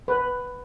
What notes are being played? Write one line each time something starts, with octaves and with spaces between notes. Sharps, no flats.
B4